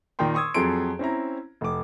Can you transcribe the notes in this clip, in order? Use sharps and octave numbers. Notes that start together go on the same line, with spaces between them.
A#2 D#3 A#4 G5 C6
C6 C#6 D#6 E6 G#6
F2 F#3 G#4 A4 C6 D7
C4 C#4 E4 A#5
F1 D6